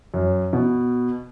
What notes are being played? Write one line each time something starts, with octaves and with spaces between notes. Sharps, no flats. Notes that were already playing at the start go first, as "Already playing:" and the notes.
F#2
B2